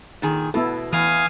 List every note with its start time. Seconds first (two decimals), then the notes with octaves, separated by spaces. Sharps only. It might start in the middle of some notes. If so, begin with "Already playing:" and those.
0.22 A#2 D#3 G#4
0.54 B2 B3 E4 A4
0.93 E2 E3 F5 G#5 D#6